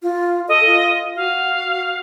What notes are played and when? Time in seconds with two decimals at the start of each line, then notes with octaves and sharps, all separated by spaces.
0.03 F4
0.48 A4 D#5
0.66 F4
1.16 F#4 F5
1.70 F#4